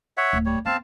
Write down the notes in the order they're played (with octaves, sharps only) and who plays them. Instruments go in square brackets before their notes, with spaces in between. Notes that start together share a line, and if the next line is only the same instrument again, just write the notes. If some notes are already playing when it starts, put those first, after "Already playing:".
[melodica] C#5 E5 F#5
[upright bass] D1
[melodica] G3 C#5
[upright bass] B3 [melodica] C4 F5 A5